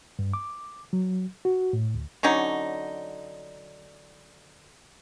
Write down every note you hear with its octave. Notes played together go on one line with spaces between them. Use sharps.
G2
D6
F#3
F#4
A2
D2
D3 F#3 C#4 D#4